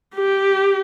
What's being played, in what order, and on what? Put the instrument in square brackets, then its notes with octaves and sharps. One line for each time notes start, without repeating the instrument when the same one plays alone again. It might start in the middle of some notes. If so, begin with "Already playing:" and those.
[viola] G4